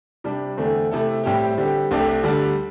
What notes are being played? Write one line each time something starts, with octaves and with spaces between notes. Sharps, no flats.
C3 G3 D4
E2 D3 A3 C4
C3 A3 E4 A4
A2 G3 C4 E4 G4
D3 G3 C4 G4
C2 C3 A3 D4 G4
D2 D3 G3 D4